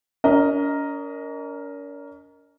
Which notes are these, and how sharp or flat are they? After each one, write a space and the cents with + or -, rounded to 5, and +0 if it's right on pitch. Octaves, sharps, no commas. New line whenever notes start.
C#4 +45 A#4 +0 D#5 +0